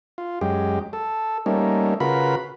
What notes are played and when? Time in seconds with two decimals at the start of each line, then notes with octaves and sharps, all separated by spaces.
0.18 F4
0.41 F#2 G#3 G4
0.93 A4
1.46 G3 A3 A#3 C#4 D#4
2.00 C#3 F4 F#4 A#4 B4 B5